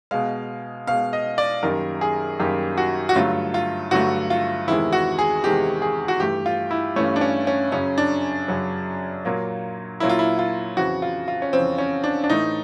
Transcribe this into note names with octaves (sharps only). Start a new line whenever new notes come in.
B2 G#3 F5
B2 G#3 F5
D#5
D5
F#2 D#3 G3 A#3 A#4
G#4
F#2 D#3 G3 A#3 G4
F#4
F#4
G2 D3 F#3 A3 F4
F4
G2 D3 F#3 A3 F#4
F4
E2 C3 D#3 G#3 E4
F#4
G#4
E2 C3 D#3 G#3 G4
G#4
F#4
G2 E3 A3 G4
F4
E4
G2 E3 A3 C#4
D4
C#4
C#4
F#2 C#3 F#3 C#4
D4
F#2 C#3 F#3
A#2 F#3 A#3
A#2 F#3 A#3 E4
F4
E4
F4
F2 C#3 E3 F#4
F4
F4
C#4
F2 C#3 E3 C4
C#4
D4
D4
A2 E3 A3 D#4